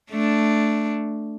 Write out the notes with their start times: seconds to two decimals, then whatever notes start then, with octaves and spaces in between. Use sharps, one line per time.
0.11 A3 D4